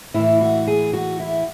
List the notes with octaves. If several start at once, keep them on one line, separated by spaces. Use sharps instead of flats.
A2 E3 E4
F#4
G#4
F#4
E4